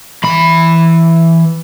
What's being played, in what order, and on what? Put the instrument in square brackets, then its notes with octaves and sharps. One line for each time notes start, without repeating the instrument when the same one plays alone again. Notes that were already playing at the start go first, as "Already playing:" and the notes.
[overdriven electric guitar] E3 B5